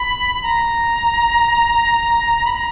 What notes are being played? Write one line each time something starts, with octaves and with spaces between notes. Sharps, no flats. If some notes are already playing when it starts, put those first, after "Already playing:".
Already playing: B5
A#5
B5
A#5